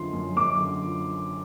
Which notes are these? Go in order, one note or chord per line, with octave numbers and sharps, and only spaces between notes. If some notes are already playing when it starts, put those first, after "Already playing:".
Already playing: F#2 D3 F3 C6
F#2
F#2 D6
D3
F3